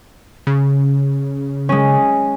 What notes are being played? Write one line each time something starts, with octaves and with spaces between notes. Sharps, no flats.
C#3
G#3 C#4